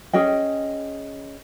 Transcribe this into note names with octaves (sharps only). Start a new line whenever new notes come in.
C#4 G#4 D#5 G5